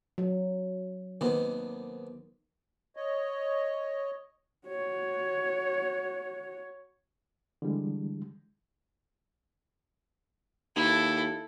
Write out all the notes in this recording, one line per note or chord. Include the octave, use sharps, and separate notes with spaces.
F#3
D#2 C3 D#3 B3
C#5 D#5
F#4 C#5
D3 E3 G3 G#3
D#2 E4 A4